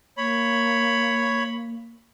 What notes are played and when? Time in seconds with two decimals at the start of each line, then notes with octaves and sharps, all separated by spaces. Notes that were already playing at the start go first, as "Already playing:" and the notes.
0.17 A#3 C#5 B5